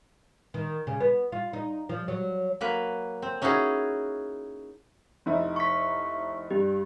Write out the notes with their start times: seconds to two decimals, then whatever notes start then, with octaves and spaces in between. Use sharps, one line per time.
0.54 D#3
0.87 C#3
1.00 B3
1.32 F4
1.53 D#4
1.89 F3
2.08 F#3
2.61 F#3 A#3 B4
3.22 C4
3.42 C#4 D#4 E4 F#4 G#4
5.26 F1 D#4 E4
5.56 C#6 B6
6.50 G2 G4